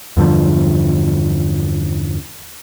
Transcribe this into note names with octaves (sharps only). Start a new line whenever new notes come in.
E2 G2 D3 F3